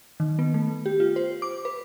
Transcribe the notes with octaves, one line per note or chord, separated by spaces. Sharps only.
D#3
B3
A3
G4
F4
C5
D6
B4